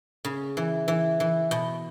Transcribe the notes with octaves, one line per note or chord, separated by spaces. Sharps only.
C#3
E3
E3
E3
B2